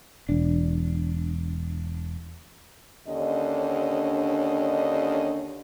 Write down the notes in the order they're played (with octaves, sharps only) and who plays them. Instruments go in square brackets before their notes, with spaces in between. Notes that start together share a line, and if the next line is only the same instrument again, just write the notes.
[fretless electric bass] E1 D4
[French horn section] D#2 D3 C#4 D4 D#5